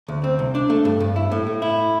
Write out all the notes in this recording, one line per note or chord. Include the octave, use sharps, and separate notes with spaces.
D2
C4
C2
D4
A3
G2
G2
E4
A2
A2
E4